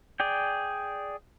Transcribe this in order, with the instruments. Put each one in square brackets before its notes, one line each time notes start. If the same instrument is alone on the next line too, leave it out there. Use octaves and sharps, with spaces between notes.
[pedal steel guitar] G#4 D5 G5